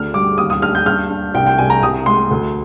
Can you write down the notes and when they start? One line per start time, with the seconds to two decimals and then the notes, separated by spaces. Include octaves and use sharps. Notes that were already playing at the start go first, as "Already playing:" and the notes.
Already playing: D2 D4 F6
0.14 G3 D6
0.38 D#2 D#6
0.50 D#6
0.62 D4 F6
0.75 G6
0.86 G2 F6
1.10 D4
1.34 C2 G5
1.47 G5
1.58 C2 G#5
1.70 A#5
1.82 C2 D#6
2.06 G#3 C6
2.31 D2